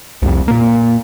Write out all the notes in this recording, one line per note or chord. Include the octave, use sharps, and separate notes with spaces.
C2 F2
A#2 A#3